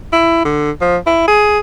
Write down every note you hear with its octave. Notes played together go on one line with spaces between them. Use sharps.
E4
D3
F3
E4
G#4